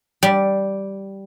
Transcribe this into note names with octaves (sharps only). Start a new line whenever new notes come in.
G3